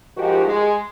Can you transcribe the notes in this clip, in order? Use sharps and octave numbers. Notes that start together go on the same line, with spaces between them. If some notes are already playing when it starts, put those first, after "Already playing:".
G#2 D#3 F3 F#4 G4
G#3